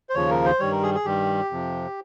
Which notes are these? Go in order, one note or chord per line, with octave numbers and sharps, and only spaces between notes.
C5
D#2 C#3 F3 C#5
A#4
C5
G2 D#3 G3 C#5
A#4
G#4
G#4
G2 D#3 G3 G4
F2 C3 F3